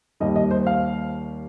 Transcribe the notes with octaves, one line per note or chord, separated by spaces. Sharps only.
D#2 D#3 G3 D#5
D#5
C5
F5